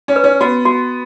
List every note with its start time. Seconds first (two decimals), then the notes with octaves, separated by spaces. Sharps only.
0.08 C#4
0.16 B4
0.24 C#4
0.41 B3 F#4
0.65 F#4